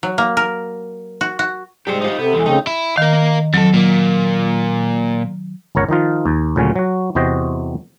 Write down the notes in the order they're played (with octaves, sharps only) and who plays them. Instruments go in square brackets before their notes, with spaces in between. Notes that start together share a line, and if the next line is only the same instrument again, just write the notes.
[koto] F#3
A#3
A#4
F#4
F#4
[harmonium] G#2 [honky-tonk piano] G3 G#4 C#7 [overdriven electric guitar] G4 C5
[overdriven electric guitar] D#4 F4 [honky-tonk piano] G4 C5
[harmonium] C3 [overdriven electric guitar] B3 [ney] A4
[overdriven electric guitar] E2 G#3 [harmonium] E3
[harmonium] C#3 C4 [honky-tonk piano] A3 [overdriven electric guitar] D#4
[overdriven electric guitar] E4
[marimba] D#3 [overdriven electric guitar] A#4 F5
[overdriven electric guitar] F2 A4 [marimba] F#3
[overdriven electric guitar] A#2 A#3
[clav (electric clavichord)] G1 C#2 A#4 C#5 F#5
D#3 F3 D#4 F4
D#2
D2 A#2 C#3 F#3 C#4
F#3 F#4
E2 C3 F#4 C5 D#5 G5